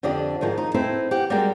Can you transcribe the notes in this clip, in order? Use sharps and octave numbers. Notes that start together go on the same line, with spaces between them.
F2 D3 D4 G4 D5 D#5
G#2 D#3 F3 G#3
D#4
C4 D#4 E4 A4 B4 C5
G4 F#5 G#5
G3 G#3 F#4 G4 A#4 G5